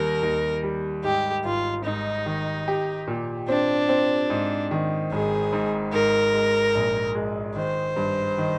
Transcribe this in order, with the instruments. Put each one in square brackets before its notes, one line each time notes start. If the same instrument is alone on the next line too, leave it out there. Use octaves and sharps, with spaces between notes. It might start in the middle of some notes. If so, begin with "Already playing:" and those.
Already playing: [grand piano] D#2 G3 [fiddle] A#4
[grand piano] D#2
G3
[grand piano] G#2 [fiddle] G4
[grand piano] G#1 [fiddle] F4
[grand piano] G#2 [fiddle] D#4
[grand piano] D#3
G4
A#2
[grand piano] C4 [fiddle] D4
[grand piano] C4
G#2
D#3
[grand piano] G#1 [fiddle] G#4
[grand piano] G#2
[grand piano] G#2 [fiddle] A#4
[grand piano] G#3
A#1
G#3
[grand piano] D#3 [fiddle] C5
[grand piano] G2
D#3